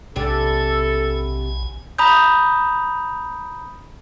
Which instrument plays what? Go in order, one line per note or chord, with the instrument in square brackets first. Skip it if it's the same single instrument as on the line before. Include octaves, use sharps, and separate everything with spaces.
[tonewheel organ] B1 G#5 [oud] C3 D4 G4 [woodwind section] A4
[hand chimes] A#5 B5 D#6 G6